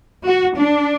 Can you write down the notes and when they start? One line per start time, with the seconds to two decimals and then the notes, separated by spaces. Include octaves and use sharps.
0.24 F#4
0.56 D4